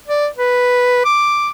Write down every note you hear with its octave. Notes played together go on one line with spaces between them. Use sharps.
D5
B4
D6